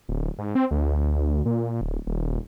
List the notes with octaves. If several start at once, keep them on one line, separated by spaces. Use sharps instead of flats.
D1
G#2
C4
D2
A#2
D1
D#1